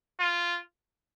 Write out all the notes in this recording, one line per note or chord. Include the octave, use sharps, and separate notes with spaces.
F4